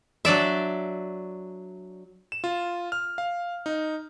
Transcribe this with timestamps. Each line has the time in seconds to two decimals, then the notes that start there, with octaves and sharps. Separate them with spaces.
0.25 F#3 D4 D5 E5
2.32 E7
2.44 F4
2.92 F6
3.18 F5
3.66 D#4